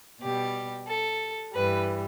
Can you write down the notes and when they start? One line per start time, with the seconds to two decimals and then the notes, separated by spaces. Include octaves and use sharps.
0.22 B2 G3 G4
0.88 A4
1.53 G2 E3 G3 B4